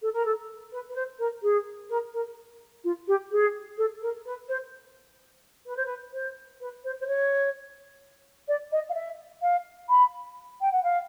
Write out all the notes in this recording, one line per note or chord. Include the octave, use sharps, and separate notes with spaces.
A4
A#4
A4
B4
B4
C5
A#4
G#4
A#4
A#4
F4
G4
G#4
A4
A#4
B4
C5
B4
C5
B4
C5
B4
C5
C5
C#5
D5
D#5
F5
E5
F5
B5
G5
F#5
F5